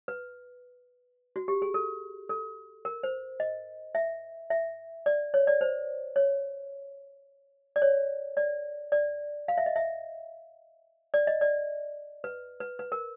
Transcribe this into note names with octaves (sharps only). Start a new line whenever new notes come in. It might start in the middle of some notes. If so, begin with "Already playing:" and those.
B4
F#4
G4
G#4
A4
A4
A#4
C5
D#5
E5
E5
D5
C#5
D5
C5
C#5
D5
C#5
D5
D5
F5
E5
D#5
E5
D5
D#5
D5
B4
B4
B4
A#4